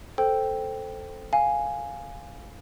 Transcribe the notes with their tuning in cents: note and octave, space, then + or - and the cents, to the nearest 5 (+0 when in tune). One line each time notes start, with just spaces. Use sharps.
A4 +0 C5 +0 G5 +0
F5 +0 G#5 +0